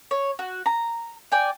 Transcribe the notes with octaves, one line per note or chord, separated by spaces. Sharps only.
C#5
F#4
A#5
D5 G5 G#5